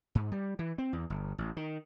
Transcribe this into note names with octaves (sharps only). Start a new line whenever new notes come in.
G#2
G3
E3
C4
E2
G1
A1
D#3